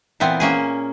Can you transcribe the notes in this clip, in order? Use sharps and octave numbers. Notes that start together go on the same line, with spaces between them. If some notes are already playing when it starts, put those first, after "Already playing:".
A#2 E3 B3 C4
A#3 C#4 G#4